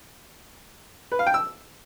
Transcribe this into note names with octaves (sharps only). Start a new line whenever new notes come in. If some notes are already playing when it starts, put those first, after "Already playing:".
B4
F5
G5
E6